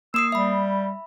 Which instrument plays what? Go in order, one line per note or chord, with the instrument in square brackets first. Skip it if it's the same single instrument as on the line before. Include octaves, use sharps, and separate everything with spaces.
[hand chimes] A#3 D#6 C7 [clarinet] E6
[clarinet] G3 [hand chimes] E5 B5